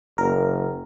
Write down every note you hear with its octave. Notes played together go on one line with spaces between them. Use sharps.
F#1 A#4